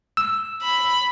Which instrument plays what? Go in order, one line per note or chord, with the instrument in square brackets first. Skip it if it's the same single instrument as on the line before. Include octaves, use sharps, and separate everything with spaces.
[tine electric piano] E6
[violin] B5